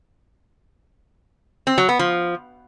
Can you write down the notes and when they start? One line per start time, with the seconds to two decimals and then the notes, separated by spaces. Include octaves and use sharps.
1.67 C4
1.78 F#3
1.89 B3
1.99 F3